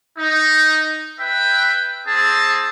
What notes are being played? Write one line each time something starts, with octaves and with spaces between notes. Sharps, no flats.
D#4
B4 E5 G5
C4 G#4 A5